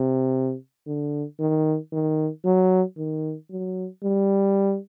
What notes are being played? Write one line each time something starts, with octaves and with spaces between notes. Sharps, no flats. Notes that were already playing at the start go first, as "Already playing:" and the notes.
Already playing: C3
D3
D#3
D#3
F#3
D#3
F#3
G3